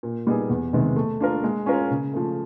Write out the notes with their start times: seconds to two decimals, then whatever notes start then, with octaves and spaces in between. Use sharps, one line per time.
0.03 A#2
0.27 G3 B3 D#4 G#4
0.50 E2
0.73 C3 D#3 G#3 B3
0.96 A3
1.21 D4 F4 A#4
1.44 G#3
1.66 C#4 F4 A#4 C#5
1.91 C#3
2.14 F3 A3